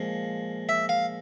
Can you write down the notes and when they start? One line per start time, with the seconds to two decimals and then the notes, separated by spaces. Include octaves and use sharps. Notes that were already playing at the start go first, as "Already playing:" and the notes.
Already playing: A#2 F3 G#3
0.69 E5
0.89 F5